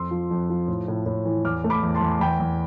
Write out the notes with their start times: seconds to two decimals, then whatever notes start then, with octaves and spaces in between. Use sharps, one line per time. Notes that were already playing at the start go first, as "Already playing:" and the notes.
Already playing: F2 C6 E6
0.11 F3
0.31 F2
0.50 F3
0.68 A2
0.88 A2
1.06 A2
1.25 E3
1.44 E2 D6 F6
1.64 A3
1.70 B5 D6
1.83 E2
1.95 A5 C6
2.01 E2
2.20 E2 G5 B5
2.40 E2